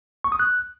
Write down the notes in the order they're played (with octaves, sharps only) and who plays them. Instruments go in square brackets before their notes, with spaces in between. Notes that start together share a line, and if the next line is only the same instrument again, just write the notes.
[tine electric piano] C#6
D#6
F#6